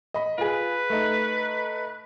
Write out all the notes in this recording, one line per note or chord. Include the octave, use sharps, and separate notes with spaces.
D#5 B5
F4 G#4 B4
A3 D#4